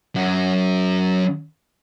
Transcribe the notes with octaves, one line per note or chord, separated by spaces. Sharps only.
F#2 F#3